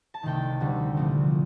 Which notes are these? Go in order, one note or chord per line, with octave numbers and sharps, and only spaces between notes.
A5
C2 C3 D#3 A3 G5
D2 D3 G3 C4
C2 A#2 F3 A3 C4